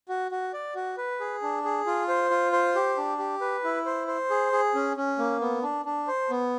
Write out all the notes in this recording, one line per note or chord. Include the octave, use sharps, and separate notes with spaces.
F#4
F#4
D5
F#4
B4
G#4
D4
G#4
F4
C5
F4
C5
G4
D4
G4
B4
E4
C5
C5
G#4
G#4
C#4
C#4
A#3
B3
D4
D4
C5
B3